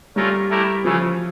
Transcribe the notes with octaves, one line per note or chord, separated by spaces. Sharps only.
G3 A3 C#4 F4 A#4
A3 E4 G4 A#4
C#3 E3 F3 A3 C#4